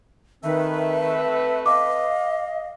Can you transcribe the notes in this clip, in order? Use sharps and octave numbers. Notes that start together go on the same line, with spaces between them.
D#3 A3 C4 B4 E5
D#5 F5 D6